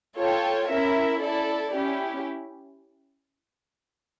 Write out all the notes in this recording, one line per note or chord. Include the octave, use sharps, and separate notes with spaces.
F4 A4 C#5 G5
C#4 E4 A#4 E5
E4 A4 D5
C#4 E4 G4